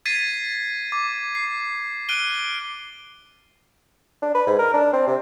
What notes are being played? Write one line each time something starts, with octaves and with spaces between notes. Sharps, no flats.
G#6 A6 B6 C7 D#7
D6
C7
F6 F#6 D7 D#7 G7
D4
B4
G#2
A#4
D4
C4
C3